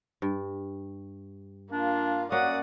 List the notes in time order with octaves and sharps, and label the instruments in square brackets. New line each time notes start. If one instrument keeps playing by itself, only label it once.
[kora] G2
[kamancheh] A#3 F4 [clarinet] D4
[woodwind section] F#2 F#5 [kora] A#3 C#4 [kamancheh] D5 D#6